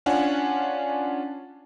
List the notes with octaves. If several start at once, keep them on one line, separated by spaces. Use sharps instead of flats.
C#4 D4 F4 F#5 G#5